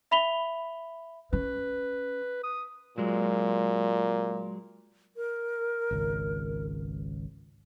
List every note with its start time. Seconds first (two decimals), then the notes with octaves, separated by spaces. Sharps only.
0.11 E5 B5 B6 F7 G7
1.33 C#4 B4
2.43 D#6
2.98 A#2 F#3 G#3
5.17 A#4
5.91 G#1 C#2